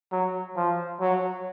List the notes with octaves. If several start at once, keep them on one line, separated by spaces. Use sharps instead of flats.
F#3
F3
F#3